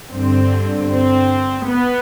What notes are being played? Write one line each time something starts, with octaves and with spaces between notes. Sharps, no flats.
G2 D3 C4
C4
B3